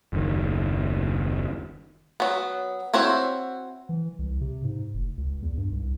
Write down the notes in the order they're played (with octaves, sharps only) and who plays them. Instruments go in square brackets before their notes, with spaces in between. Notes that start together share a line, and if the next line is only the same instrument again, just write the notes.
[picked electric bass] F#1 D#2 D#3
[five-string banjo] F#3 B3
C4 E4 F#4 C5 C#5
[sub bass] E3
C2
C3
G#2
F1
C#2
E2
G2
C2